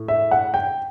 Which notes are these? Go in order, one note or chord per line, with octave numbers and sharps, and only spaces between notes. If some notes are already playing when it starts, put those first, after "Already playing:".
Already playing: A2
E5
F#5
G5